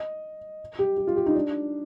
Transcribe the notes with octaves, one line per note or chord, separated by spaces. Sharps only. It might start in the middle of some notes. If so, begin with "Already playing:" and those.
Already playing: D#5
G4
G4
F4
G4
D#4
D4